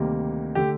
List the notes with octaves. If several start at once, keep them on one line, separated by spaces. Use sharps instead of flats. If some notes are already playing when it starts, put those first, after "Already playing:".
Already playing: D2 C3 D#3 G3 A#3
D3 A3 G4